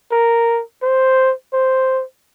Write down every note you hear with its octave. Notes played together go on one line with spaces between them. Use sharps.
A#4
C5
C5